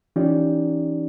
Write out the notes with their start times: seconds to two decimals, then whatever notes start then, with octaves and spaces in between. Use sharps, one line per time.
0.16 E3 C#4 D#4 F4 G4 D5